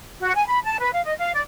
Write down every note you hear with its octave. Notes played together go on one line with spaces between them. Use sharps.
F#4
G#5
B5
A5
B4
F5
D#5
F5
D5